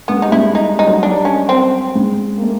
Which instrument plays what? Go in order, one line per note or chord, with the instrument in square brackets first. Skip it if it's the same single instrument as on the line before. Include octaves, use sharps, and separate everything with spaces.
[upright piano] G#3 [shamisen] B3
[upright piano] G3 [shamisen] D#4
[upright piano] G#3 [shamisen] E4
[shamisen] D#4
[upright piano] G3
[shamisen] D#4
[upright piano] F#3
[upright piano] G3 [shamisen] D4
[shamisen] C#4
C4
[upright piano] G#3
A#3
A3